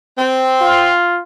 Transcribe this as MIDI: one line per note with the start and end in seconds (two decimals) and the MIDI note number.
0.18 0.92 60
0.61 1.21 65